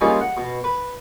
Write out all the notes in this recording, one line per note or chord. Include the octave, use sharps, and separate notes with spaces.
G3 A#3 C#4 D#4 F4 G#4
F#5
B2
B4